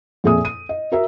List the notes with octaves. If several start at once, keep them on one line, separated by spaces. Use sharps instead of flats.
F2 A#2 G#4 E5 G#5 D#6
D#7
D#5
F#4 A#4 E5